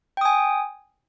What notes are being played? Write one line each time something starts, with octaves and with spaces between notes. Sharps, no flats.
G5 G#5 D#6